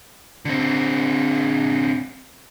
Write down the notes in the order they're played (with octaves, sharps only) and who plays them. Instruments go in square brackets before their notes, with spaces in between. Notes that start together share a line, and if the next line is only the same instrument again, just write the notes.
[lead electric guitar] D3 C4